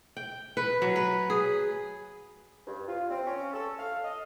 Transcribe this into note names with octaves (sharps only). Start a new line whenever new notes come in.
G5
B4
F#3
B4
G#4
G2
F4
C4
C#4
A4
F5
D#5